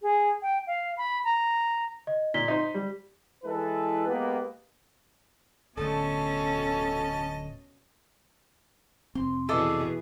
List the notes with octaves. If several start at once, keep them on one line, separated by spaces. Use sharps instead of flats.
G#4
G5
F5
B5
A#5
D#5
A#2 B6 G7
D#4 C5
G3
E3 G#3 E4 A4 B4
G#3 A#3 B3 G4 B4
D1 B2 D3 A3 C#4 A4 D#5 A5
F1 C4 C6
B2 E3 G#4 A4 D5 D#5